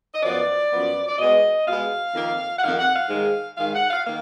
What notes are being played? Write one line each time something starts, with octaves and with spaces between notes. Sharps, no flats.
D#5
F#2 F3 B3 D5
F#2 F3 B3
D5
B2 G#3 B3 D#5
B2 G#3 B3 F5
F2 D#3 A#3
F#5
F2 D#3 A#3 F5
F#5
F5
G#2 D#3 G#3
G#2 D#3 G#3 F5
F#5
F5
D#3 A#3 F5